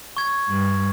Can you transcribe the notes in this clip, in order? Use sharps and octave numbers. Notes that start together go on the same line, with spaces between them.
C#6 G#6
G2